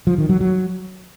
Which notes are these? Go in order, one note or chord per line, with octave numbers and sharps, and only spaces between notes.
F3
D#3
F#3
F#3